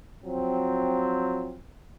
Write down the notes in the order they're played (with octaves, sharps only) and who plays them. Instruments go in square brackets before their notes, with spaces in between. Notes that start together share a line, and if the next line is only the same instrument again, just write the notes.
[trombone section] F3 F#3 C4